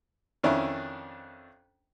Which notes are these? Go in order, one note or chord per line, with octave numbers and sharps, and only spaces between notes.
F2 D#3 C#4 D4 E4